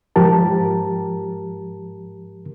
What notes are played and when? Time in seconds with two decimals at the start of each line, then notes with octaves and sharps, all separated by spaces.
0.16 G#2 F3 G4 A#4 A5